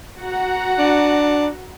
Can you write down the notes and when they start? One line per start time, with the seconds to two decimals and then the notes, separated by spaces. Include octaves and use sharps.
0.19 F#4 F#5 A#5
0.79 D4